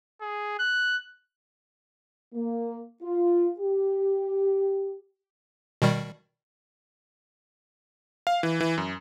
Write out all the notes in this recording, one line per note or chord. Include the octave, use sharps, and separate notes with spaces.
G#4
F#6
A#3
F4
G4
B2 D#3 G3
F5
E3
E3
F#2